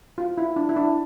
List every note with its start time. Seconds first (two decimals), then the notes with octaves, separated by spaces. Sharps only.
0.18 F4
0.38 E4
0.56 D4
0.69 E4
0.76 D4